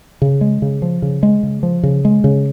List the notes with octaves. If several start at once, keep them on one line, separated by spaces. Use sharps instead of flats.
C#3
G#3
C#3
F3
C#3
G#3
C#3
F3
C#3
G#3
C#3